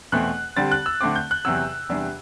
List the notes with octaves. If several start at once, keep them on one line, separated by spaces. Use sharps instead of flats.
E2 B2 A3 C4 F#6
D3 G3 C4 A6
F#6
E6
D3 A3 C4 D6
G6
F#6
E2 C3 F#3 E6
E2 C3 G3 D4